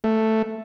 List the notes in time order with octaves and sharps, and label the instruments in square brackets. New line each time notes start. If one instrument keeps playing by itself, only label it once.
[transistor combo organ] A3